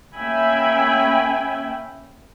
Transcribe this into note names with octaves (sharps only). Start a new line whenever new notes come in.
A#3 C#4 E5 G5 G#5 B5